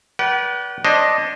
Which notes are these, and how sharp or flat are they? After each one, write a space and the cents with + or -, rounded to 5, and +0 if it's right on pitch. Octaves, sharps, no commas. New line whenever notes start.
B4 -30 D5 -25 F#5 +45
D4 +0 C5 +40 D#5 +0